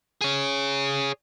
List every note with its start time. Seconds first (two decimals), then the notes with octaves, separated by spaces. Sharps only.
0.21 G#4 C#5